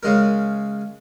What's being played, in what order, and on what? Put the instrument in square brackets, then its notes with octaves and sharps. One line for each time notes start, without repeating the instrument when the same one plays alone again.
[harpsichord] C#3 G#3 A#4